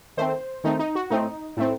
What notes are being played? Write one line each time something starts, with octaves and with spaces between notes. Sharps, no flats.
D#3 A3 C4 C5
D#3 A3 C4 D#4
D#4
F#4
A2 A3 C4 D#4
A2 A3 C4